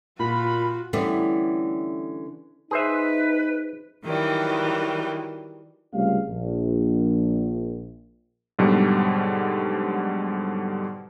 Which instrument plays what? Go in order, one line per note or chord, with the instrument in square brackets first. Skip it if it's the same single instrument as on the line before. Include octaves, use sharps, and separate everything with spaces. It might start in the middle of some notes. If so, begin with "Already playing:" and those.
[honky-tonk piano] A#2 [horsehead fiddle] F4 F#4 [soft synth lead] B5
[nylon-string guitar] D3 E3 G3 A3 B3 C#4
[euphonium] D#4 [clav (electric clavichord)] G#4 C5 E5 [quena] B4
[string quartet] D#3 E3 F#3 G3
[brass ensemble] C#2 C3 G3 A3 F5
A#1
[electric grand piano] G#2 B2 D3 F#3 G3